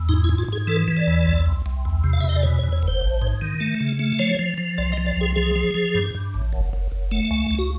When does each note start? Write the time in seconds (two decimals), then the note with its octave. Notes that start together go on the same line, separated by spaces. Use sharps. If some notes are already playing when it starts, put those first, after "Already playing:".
Already playing: E2
0.09 G#2 D#4
0.24 E4
0.29 G#2
0.38 F4
0.48 G#2 G#4
0.67 E3 A4
0.88 E3
0.97 D5
1.07 E2
1.26 C2
1.46 C2
1.66 C2
1.85 E2
2.04 C3
2.13 F5
2.20 E5
2.24 E2 D#5
2.36 D5
2.43 B2 C#5
2.59 C#5
2.63 E2
2.72 C#5
2.83 F#1
2.88 C5
3.01 A1
3.22 G#2
3.41 D#3
3.60 A3
3.81 C#3
3.99 A3
4.19 F3 C#5
4.39 F3
4.58 F3
4.78 C2 D5
4.92 D#5
4.98 F3
5.06 D5
5.17 C2 G#4
5.36 F3 G#4
5.56 F3
5.74 F3
5.95 G2
6.15 G2
6.34 A1
6.52 F#1
6.73 F#1
6.92 F#1
7.11 A3
7.31 C#2
7.51 C#2
7.59 F#4